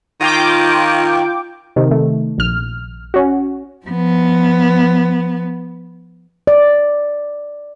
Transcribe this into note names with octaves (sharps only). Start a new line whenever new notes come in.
D#3 F4 G5 D6
C3 D#3
A3
A#1 F6
C#4 F#4
F3 B3
D5